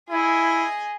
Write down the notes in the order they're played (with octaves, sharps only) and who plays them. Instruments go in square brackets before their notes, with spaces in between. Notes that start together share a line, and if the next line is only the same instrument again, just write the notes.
[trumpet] E4 [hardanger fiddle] G#4 D#5